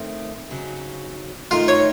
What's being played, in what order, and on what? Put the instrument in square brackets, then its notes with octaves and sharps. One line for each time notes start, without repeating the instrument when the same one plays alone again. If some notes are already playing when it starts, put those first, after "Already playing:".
Already playing: [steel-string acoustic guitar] D#3 A3 C4
C#3 F#3 C4 D#4
[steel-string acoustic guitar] D#3 A3 D#4 [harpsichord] F4
[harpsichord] C#5